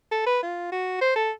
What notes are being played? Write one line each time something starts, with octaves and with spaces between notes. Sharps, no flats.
A4
B4
F4
F#4
C5
A4